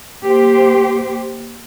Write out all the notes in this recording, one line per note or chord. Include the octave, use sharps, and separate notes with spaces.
A#3 G4 C5